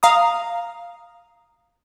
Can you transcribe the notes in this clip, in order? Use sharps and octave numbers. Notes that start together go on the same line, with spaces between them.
F5 A#5 D#6